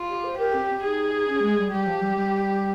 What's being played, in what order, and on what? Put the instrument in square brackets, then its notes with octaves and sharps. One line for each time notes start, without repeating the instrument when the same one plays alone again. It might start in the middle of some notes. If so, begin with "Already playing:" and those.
Already playing: [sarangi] F4
[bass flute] G4
C5
[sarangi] G4 [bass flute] A#4
[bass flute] C4
[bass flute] D#4 [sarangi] G#4
[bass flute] C#4
G#3
G3
[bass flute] G3 [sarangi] G4
[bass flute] F3
G3
G3